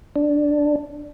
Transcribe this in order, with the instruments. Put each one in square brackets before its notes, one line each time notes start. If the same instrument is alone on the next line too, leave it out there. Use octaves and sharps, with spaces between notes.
[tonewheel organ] D4